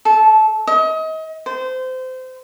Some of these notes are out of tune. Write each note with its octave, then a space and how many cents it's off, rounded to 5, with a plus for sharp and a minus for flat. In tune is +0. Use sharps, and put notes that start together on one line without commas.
A4 -20
D#5 +35
C5 -25